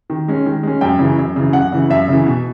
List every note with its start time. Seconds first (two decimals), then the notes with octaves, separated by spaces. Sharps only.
0.10 D#3
0.28 G#3 C#4
0.46 D#3
0.63 G#3 C#4
0.81 F#2 G5
0.99 C#3 E3
1.18 F#2
1.36 C#3 E3
1.53 F#2 F#5
1.72 C#3 E3
1.90 F#2 E5
2.08 C#3 E3
2.25 B2